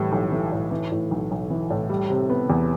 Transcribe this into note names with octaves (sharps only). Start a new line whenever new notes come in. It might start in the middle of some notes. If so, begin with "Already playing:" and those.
Already playing: A2 E3 G3
B1
E3
A2
E3
A2
B1
B1
E3
A2
G3
C3
B3
E2